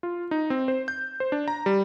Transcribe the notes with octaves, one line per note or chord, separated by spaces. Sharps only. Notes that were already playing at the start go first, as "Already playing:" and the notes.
F4
D#4
C4
C5
G6
C5
D4
A#5
G3